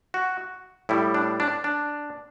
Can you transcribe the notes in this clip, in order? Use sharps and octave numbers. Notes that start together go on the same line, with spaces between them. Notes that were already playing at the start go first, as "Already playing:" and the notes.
F#4
A2 G3 E4
D4
D4
D4